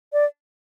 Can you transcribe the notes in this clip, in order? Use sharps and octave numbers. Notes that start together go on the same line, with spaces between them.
D5